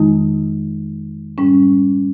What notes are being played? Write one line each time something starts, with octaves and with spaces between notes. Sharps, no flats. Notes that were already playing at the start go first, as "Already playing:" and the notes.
Already playing: F2 D#3 G#3 D#4
G#2 G3 C#4